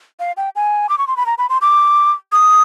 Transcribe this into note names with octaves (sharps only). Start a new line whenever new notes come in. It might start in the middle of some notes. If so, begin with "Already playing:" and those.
F5
G5
G#5
D6
C#6
C6
B5
A#5
B5
C6
D6
D#6